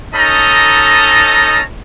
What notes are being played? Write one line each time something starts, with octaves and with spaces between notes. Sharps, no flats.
C#4 D#4 A4 D#5 A5 A#5